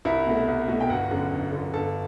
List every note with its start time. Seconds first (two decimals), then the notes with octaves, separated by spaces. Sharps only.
0.05 C2 E4 E5
0.26 B2 A3
0.48 C2
0.68 B2 A3
0.81 G5
0.89 G1 F#4 F#5
1.11 F#2 D3
1.31 G1
1.52 F#2 D3
1.73 G1 A4 A5